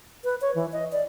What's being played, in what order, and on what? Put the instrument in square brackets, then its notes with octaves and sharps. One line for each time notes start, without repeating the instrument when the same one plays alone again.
[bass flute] B4
C#5
E3
D#5
D5